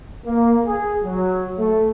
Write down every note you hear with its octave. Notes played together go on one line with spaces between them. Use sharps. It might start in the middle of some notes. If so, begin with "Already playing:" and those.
A#3
G#4
F#3
A3